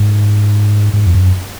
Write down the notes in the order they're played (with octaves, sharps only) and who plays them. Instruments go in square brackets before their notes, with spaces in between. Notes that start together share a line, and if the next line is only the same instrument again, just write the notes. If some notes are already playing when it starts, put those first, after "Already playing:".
Already playing: [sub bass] G#2
G#2
F2
F#2